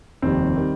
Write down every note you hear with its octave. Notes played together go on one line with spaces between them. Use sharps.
F1 D#2 D#3 G3 C4
D#3 G3